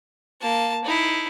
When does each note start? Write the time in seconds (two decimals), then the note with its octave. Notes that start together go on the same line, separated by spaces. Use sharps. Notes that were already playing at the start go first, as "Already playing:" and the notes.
0.42 A#3 A5
0.84 D#4 E4